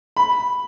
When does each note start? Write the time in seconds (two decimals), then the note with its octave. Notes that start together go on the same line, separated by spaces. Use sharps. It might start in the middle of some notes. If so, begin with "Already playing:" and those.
0.17 B5